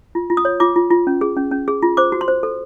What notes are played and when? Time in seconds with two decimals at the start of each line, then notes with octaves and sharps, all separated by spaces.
0.15 F4
0.30 F4
0.37 D#6
0.45 C#5
0.60 F4 D6
0.76 F4
0.91 F4
1.07 C#4
1.21 G#4
1.37 C#4
1.51 C#4
1.68 G#4
1.83 F4
1.97 C5 D6
2.12 F#4
2.21 C6
2.28 C5
2.43 A4